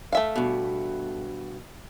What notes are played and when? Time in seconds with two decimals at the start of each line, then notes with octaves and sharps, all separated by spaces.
0.12 A3 E5 F5
0.36 G2 B2